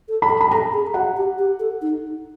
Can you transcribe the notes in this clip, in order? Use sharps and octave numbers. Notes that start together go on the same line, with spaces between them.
A4
B5
A4
B5
A4 A#5
G#4
F#4 F#5
G4
G4
A4
D#4